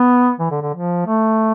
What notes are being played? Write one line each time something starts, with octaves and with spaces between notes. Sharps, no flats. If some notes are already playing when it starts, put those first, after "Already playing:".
Already playing: B3
E3
D3
D3
F3
A3